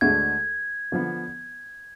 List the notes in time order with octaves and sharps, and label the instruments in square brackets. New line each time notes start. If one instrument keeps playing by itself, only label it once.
[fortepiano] D2 D3 G#3 [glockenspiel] G#6
[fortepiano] D3 F3 B3